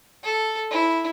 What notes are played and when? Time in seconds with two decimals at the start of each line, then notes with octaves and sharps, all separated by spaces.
0.23 A4
0.71 E4